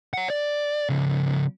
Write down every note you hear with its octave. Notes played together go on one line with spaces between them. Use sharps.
C#5 F#5
D5
C#3 F3